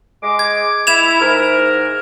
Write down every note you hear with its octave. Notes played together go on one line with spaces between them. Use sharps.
G#3 D6
G#6
E4 G#6 E7 F7
G#2 A#4